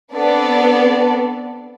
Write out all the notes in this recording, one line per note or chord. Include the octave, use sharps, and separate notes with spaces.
B3 C4 D4 A4 D5